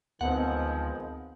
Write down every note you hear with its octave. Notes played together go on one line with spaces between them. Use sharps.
D2 D#3 F3 G#3 B3 C4 F#5